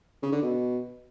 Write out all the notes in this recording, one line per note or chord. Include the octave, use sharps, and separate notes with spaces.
C#3
D3
B2